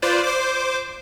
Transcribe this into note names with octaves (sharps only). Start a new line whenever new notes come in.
F4 B4 C5 D5
C5 D6